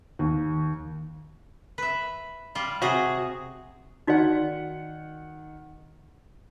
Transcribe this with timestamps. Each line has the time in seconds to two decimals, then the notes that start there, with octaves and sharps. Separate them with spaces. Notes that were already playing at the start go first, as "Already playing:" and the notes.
0.19 D#2
1.78 B4 E5
2.55 G3 F4
2.82 C3 F#4 G#4
4.07 D#3 D#4 F#4 D5 F#5